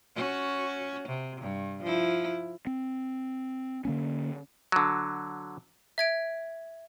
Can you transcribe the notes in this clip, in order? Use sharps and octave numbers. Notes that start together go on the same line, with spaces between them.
C#4 F#4
C3
G2
F3 E4
C4
D3 A#3 C#4
D3 F#3
E5 G#6 D7